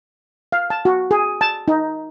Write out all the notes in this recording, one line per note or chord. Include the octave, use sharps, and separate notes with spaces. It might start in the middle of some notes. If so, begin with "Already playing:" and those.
F5
A5
F#4
G#4
A5
D#4